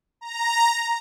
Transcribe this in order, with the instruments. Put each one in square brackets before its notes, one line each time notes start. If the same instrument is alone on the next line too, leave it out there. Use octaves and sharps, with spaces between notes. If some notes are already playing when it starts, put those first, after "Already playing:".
[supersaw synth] A#5